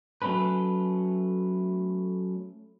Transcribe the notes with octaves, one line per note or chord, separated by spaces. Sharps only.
F#3 A3 C#4 A4 B4